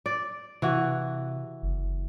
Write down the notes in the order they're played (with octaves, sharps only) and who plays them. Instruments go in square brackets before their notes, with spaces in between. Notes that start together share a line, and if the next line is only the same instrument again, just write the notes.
[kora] D5
[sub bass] C3 [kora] E3 F#4
[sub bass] F#1